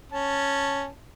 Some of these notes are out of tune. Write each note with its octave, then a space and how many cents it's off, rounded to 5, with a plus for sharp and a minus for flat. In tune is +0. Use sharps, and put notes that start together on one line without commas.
C#4 +0 A5 +0